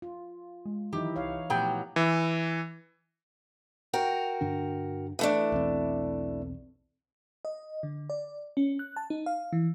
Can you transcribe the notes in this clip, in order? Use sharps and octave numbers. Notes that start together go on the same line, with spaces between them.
F4
G#3
D#3 E3 F#3 D#4 E4 G4
C2 C#5 F5
A#2 F3 F#3 A3 B3 G4 G5
E3
F#4 A#4 G5
G2 D3 D4
E3 A3 D4
B1 E2 C4
D#5
D3
D5
C#4
F#6
A5
D#4
F5
E3